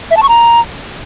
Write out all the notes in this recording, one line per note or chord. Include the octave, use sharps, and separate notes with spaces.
E5
A5
C#6
A#5